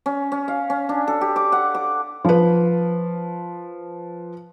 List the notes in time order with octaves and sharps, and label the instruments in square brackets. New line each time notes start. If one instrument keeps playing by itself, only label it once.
[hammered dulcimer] C#4
C#4
F5
C#4
D4
A4
G4
D6
F#5
D6
[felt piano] F3 B4